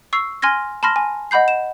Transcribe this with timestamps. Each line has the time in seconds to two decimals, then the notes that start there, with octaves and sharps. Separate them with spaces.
0.13 C#6 E6 C7
0.42 G#5 C6 F6 G#6 A#6
0.83 A5 B5 C6 F6 A#6
0.96 G#5
1.31 D#5 F#5 B5 G6 C7
1.48 E7